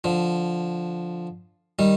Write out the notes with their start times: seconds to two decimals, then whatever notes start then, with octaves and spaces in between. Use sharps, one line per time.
0.04 D3 F3
1.79 D#3 G3